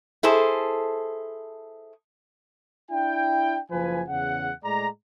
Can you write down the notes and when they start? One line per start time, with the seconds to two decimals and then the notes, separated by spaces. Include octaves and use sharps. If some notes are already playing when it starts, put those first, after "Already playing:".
0.23 E4 G#4 A4 C5
2.91 D4 E4 G5
3.70 F#1 F3 B4 G#5
4.08 E2 C#3 F#5
4.64 A2 G#3 D5 A#5